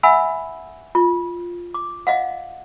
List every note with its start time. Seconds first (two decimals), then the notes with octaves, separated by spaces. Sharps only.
0.03 E5 F#5 G#5 B5 E6
0.95 F4
1.74 D6
2.07 D#5 F5 F#5